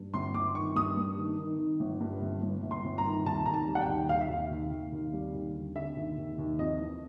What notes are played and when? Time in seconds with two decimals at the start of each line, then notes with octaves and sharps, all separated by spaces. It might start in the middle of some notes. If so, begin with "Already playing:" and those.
Already playing: G2
0.14 G1 C6
0.34 G1 D6
0.55 D#3 C#6
0.76 G2 D#6
0.97 G2
1.18 D#3
1.39 D#3
1.59 D#3
1.80 G1
2.01 G2
2.22 G1
2.42 G1
2.63 G1
2.71 C6
2.85 G1
2.98 A#5
3.05 D#3
3.26 D#2 A5
3.46 D#2 A#5
3.54 A5
3.68 G3
3.75 F#5
3.81 G5
3.88 D#2
4.09 D#2 F5
4.21 E5
4.30 D#2 F5
4.50 D#2
4.71 D#2
4.92 D#2
5.13 G3
5.34 D#2
5.55 D3
5.75 D3 E5
5.96 D#2
6.17 D#2
6.38 D#2
6.59 F2 D#5
6.80 E3